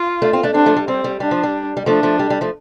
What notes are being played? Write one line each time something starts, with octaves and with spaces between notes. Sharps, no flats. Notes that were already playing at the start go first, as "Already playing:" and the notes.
Already playing: F4
A3 D4
C4 F4
A3 D4
G3 C4 D4
F3 A3
G3
G3 C4
G3
G3 D4
F3
G3
G3
F3 A3 D4
F3 A3
G3
G3
F3 A3